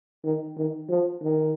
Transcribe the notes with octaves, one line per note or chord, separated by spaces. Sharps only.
D#3
D#3
F3
D#3